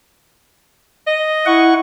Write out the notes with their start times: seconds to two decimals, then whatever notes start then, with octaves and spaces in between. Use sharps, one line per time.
1.07 D#5
1.46 E4 F#5 C#6